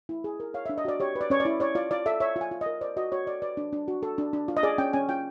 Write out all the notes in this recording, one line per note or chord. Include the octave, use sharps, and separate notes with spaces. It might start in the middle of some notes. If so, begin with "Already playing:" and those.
E4
G#4
A#4
C#5 F5
D4 E5
D#5
F#4 D5
G4 C#5
B4
D5
C#4 C#5
D5
E4
C#5 D5
F4 D5
F4 D5
A4 E5
C#5 E5
F4
G#5
F4
D#5
A#4
C5 D5
F#4 D#5
F#4 C#5
A4 D5
B4 D5
D4
D4
F#4
A4
D4
D4
F4
D#5
G#4 D5
C#4 G5
C#4 G#5
F4 G5